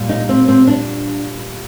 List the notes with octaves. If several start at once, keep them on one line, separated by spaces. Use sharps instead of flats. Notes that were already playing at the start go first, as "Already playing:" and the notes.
Already playing: A#2 G3
D#4
C4
C4
D4